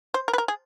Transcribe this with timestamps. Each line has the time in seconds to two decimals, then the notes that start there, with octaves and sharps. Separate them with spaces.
0.14 C5
0.28 A#4
0.33 B4
0.38 A#4
0.48 G#4